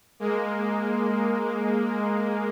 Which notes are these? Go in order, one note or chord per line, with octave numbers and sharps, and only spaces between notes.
G#3 A#3